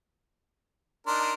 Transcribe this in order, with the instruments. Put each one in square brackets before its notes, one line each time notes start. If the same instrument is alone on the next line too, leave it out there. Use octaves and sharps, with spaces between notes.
[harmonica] D4 D#4 A#4 [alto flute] C6